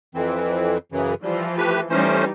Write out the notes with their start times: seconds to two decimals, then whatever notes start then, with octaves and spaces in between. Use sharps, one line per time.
0.15 F2 E3 C4
0.92 F#2 C#3 E3
1.23 E3 F3 G3
1.57 A3 G4 B4
1.90 E3 G3 A3 C#4 D#4 C5